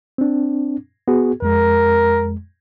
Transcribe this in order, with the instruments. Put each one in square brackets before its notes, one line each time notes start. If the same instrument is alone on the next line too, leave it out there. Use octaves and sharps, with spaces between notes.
[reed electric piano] C4 D4
B3 F#4 G#4
[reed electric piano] F2 G#3 [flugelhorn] A#4